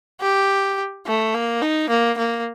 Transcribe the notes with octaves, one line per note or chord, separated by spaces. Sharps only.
G4
A3
A#3
D#4
A#3
A#3